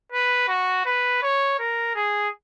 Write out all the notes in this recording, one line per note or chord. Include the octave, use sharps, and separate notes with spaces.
B4
F#4
B4
C#5
A#4
G#4